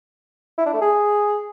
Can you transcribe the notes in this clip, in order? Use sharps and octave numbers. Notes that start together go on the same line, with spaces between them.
E4
D4
A3
G#4